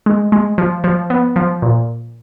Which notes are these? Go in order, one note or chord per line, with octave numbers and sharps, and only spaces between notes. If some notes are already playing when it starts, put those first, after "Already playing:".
G#3
G#3
F3
F3
B3
F3
A#2